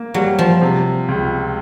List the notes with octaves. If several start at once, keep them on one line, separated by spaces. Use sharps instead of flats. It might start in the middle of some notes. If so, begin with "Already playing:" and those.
Already playing: A#3
F#3 G3
F3
C3
C#2